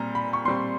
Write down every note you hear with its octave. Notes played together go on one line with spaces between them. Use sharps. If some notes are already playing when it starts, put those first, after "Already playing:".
Already playing: A#2 G3 C4 A#5
B5
C#6
A#2 G3 C4 C6